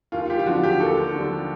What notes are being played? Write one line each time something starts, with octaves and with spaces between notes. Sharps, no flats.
D#2 F4
G4
F4
D3 F3 F#4
G4
D#2 A4
D3 F3